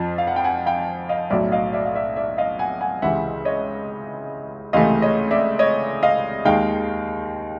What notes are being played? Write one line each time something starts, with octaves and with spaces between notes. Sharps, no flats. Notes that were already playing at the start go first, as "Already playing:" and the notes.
Already playing: F2 F3
F5
F#5
G5
F#5 G#5
F5 G5
D#5 F5
B1 A2 F#3 D5 E5
D#5 F5
D5 E5
F5
D5 E5
D5 E5
D#5 F5
F#5 G#5
F#5 G#5
C#2 C3 E3 E5 F#5
C#5 D#5
C#2 C3 E3 A3 D#5 F5
C#5 D#5
D5 E5
C#5 D#5
D#5 F5
D#2 D#3 G#3 F5 G5